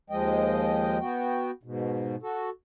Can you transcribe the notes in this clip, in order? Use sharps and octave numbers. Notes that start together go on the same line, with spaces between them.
D#2 F3 G#3 D#5 G5
B3 F#4 G5
G#2 B2
F#4 A4